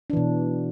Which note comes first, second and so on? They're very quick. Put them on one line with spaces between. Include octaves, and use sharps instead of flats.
D4 E3 B2